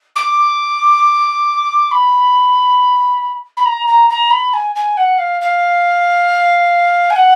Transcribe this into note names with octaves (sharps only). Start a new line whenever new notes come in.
D6
B5
B5
A#5
A#5
A#5
B5
G#5
G#5
F#5
F5
F5
G#5
F#5